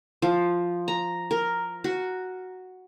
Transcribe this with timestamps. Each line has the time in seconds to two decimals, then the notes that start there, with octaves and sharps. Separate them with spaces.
0.22 F3
0.88 A#5
1.31 A#4
1.84 F#4